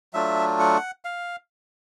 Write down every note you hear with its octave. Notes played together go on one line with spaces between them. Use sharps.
F#3 A3 D4 F4 E5
F#5
F5